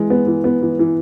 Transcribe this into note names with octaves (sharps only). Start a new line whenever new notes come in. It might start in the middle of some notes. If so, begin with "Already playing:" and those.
Already playing: E3 G#3
B3
E3
B3
E3
E3